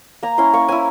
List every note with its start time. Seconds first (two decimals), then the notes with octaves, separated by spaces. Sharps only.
0.23 A#3 A#5
0.38 C#4 E4 C6
0.53 A#3 C#6
0.68 C#4 E4 G#5